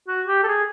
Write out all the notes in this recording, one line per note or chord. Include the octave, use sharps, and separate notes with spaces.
F#4
G4
A4
G#4